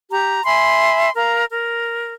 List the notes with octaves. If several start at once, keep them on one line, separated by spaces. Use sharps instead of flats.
G4 A#5
E5 G#5 B5 C6
A#4 F5 A#5
A#4